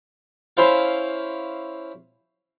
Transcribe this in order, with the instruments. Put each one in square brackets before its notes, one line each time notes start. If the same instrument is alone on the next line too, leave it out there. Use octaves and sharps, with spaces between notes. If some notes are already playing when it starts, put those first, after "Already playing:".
[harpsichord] C#4 E4 C5 F5